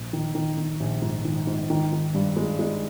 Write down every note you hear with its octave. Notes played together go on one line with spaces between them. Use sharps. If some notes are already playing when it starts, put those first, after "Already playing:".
Already playing: A#1
D#3
D#3
D#3
A#1
G#2
D#3
G#2
D#3
D#3
G2
G#3
G#3